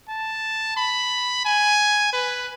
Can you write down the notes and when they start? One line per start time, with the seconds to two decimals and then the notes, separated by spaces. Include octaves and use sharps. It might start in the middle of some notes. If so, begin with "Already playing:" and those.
0.09 A5
0.77 B5
1.45 G#5
2.13 B4